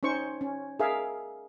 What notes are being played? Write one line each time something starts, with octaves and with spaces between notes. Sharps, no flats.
C#4 D#4 C5 C#6
C#4
G#4 A#4 E5 F5